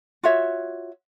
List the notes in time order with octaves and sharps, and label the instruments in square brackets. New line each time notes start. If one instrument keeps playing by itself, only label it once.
[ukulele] F4 F#4 C#5 E5